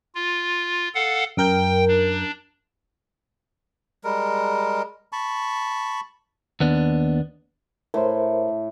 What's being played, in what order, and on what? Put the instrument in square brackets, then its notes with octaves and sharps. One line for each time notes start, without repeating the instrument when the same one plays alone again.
[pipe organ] F4
A4 F5 F#5
[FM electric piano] F#2 A#4 G6 [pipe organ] G5
[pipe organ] D4
[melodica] G3 G#3 A#4
A5 B5 C#6
[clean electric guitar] D#2 B3 D4
[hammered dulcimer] A2 [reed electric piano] A#4 C5